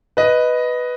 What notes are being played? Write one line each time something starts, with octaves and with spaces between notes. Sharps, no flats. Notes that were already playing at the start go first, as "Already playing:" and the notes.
B4 D#5